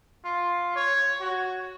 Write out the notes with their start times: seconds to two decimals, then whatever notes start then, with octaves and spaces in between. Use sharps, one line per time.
0.25 F4
0.76 C#5
1.21 F#4